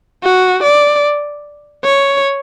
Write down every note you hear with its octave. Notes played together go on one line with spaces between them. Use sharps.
F#4
D5
C#5